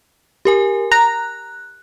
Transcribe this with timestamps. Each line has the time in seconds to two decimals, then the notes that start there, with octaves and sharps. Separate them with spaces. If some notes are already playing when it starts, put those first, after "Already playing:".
0.45 G4 A#4 G#5
0.92 A#5 F#6